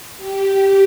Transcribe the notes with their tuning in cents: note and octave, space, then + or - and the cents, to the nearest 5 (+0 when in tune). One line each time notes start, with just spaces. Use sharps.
G4 -10